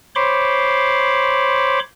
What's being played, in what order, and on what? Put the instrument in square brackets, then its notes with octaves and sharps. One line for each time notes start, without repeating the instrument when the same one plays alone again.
[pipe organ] C5 C#5 B5 C6 D6